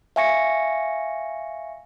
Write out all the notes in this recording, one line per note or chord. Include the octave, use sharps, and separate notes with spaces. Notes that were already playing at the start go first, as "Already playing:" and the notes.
E5 F5 G#5 C#6 A#6 C#7